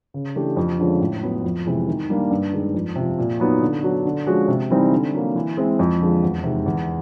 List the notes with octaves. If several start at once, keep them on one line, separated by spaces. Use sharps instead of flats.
C#3
E3 A3 D4 G4
F2
D3 F3 G#3 C#4
A2
F#3 B3
F2
C3 E3 G#3
D#3
G3 A#3 D4
G2
D#3 G#3
F2
C3 F3
A#2
F#3 B3 D#4
D3
F#3 B3 D4 F#4
D3
F3 G#3 C#4 F#4
C3
E3 G3 C4 D#4
D3
F#3 A#3
E3
G#3 C4 E4
F2
D3 F3 G#3
E2
C3 D#3 G#3
E2